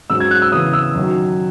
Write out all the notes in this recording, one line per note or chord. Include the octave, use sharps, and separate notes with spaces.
G#2 F#3 C#4 E6
G#6
F#6
E6
C#3 E3 B3 D#6
E6
F#2 D#3 F#3